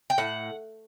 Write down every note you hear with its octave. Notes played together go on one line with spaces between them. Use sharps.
G5
A2 F#5